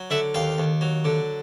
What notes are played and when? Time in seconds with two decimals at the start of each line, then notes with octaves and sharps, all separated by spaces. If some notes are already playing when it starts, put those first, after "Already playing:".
Already playing: F#3
0.10 D3 E5 F#5
0.34 D#2 F5 G5
0.58 D#2
0.81 F#3
1.05 D3